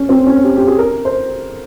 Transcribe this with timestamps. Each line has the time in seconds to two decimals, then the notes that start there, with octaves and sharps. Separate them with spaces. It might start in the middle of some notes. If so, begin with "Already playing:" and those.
Already playing: C#4
0.09 C4
0.26 C#4
0.44 G4
0.56 G4
0.67 G#4
0.79 A#4
1.05 C5